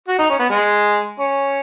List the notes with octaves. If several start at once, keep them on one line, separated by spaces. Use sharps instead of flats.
F#4
D#4
C#4
B3
G#3
C#4